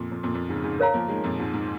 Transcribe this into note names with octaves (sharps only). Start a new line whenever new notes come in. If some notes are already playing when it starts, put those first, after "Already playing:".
Already playing: F2 A#2
F2
F2 A#2
F2 A#2
G#2 C#3
G#2 C#3
A#4 C#5 F5 A#5
F3 A#3
D#3 G#3
F2 A#2
G#2
G#2